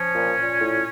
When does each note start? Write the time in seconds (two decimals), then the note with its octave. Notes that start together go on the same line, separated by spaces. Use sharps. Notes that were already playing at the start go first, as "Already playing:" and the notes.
Already playing: F3 C#4
0.13 A#2
0.36 A#2
0.59 A2